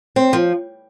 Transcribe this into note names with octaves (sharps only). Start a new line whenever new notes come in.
C4
F3